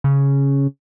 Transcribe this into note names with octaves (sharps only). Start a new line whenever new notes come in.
C#3